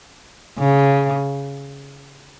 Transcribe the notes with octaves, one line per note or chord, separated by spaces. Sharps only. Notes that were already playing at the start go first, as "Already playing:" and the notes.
C#3